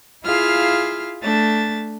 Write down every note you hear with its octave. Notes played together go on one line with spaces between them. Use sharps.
E4 F4 G#4 F5 F6
A3 D4 A6